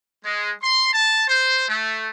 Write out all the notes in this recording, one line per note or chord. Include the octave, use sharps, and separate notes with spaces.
G#3
C6
A5
C5
A3